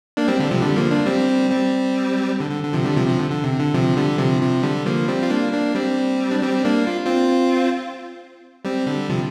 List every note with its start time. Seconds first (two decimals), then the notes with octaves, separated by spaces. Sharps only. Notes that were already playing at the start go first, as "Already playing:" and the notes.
0.17 A#3 D4
0.28 G3 C4
0.39 D3 G3
0.51 C3 F3
0.61 D3 G3
0.76 F3 A#3
0.91 A#3 D4
1.06 G3 C4
1.51 G3 C4
2.40 D3
2.51 D3
2.63 D3
2.73 C3 F3
2.84 D3 G3
2.96 C3 F3
3.07 C3 F3
3.19 D3
3.30 D3
3.44 C3
3.59 D3
3.74 C3 F3
3.97 D3 G3
4.18 C3 F3
4.42 C3 F3
4.63 D3 G3
4.86 F3 A#3
5.08 G3 C4
5.23 F4
5.30 A#3 D4
5.53 A#3 D4
5.75 G3 C4
6.31 D4
6.43 G3 C4
6.64 A#3 D4
6.87 F4
7.06 C4 F4
8.65 G3 C4
8.87 D3 G3
9.09 C3 F3